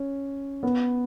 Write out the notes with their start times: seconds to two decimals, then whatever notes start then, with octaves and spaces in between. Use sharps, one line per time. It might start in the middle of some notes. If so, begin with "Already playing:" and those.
Already playing: C#4
0.63 B3